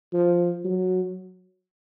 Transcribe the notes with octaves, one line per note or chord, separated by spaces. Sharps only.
F3
F#3